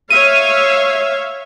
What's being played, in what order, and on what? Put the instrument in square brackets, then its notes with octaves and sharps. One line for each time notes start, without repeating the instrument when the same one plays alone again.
[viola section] C#5 E5 F5 [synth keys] D#7